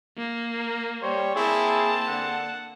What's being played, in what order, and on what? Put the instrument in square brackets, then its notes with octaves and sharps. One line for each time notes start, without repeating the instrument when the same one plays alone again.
[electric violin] A#3
[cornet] A#4
[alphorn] G3 [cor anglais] C5 [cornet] C#5
[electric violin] A#3 A5 [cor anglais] C4 [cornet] E4 [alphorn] G#4
[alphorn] D3 [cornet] F#5